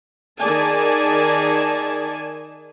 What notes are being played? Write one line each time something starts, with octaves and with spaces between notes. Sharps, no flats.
D#3 G#4 D5 G#5 A5